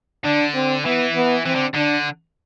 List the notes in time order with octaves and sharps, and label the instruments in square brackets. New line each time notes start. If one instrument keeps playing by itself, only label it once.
[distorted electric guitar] D3 [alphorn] D4
[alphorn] C4
[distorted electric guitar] E3 [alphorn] B3
[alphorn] B3
[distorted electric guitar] E3 [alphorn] C4
[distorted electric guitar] D3
[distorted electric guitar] D3 [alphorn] D4